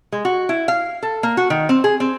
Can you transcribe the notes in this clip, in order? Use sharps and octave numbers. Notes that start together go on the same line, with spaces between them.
G#3
F#4
E4
F5
A4
A#3
F#4
D#3
C4
G#4
C4